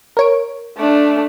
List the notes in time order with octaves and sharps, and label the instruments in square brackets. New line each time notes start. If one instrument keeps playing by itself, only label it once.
[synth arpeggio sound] A#4 C#5 D7
[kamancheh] A3 D4